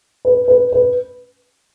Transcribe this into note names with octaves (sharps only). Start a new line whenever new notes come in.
B4
B4
B4